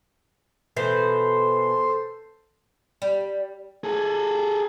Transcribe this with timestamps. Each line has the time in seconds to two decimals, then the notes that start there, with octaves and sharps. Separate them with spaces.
0.77 B2 E3 A4 C5
3.02 G3
3.84 G#4 A4